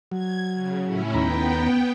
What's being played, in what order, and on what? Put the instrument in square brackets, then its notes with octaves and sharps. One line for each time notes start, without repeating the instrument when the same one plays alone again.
[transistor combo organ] F#3 [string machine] G#6
[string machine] C#3
A2 C#4 E4
[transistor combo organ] D#2 A#5 B5 [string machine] B3 G5